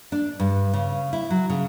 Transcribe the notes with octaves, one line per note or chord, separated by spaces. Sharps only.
D4
G2
C#3
E4
F#3
C#3